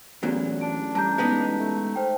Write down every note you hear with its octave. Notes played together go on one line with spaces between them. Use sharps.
A1 E2 A#2 F#3
D4 D7
G2 A5 A#5 G6
G#3 B3 D#4
A3
C5 G5